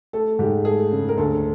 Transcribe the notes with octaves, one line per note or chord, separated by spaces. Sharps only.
A3 A4
G#2 G4
A3 G#4
C#3
A#4
D2 A4